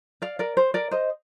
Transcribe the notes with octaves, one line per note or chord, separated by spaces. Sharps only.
D5 F5
A#4 D5
C5
A#4 D5
C5 D#5